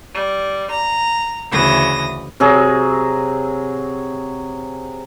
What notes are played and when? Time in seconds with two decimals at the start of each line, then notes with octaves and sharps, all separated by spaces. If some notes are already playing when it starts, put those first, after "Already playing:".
0.13 G3
0.71 A#5
1.51 D2 C#3 E3 D#6 A#6
2.40 C3 F#3 G#4